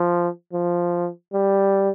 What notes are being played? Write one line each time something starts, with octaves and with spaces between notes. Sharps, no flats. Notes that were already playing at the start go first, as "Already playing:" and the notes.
Already playing: F3
F3
G3